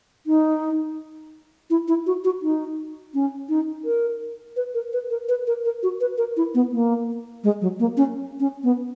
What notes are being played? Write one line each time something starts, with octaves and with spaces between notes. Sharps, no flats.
D#4
E4
E4
F#4
F#4
D#4
C#4
D#4
A#4
B4
A#4
B4
A#4
B4
A#4
A#4
F#4
B4
A#4
E4
B3
A#3
G#3
F#3
A#3
C#4
C#4
B3